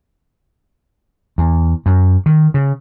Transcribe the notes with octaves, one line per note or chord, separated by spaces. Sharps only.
E2
F#2
D#3
C#3